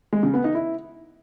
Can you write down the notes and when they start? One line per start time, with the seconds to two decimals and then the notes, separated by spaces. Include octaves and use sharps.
0.13 G#3
0.23 C#3
0.34 B3
0.44 D#4
0.55 E4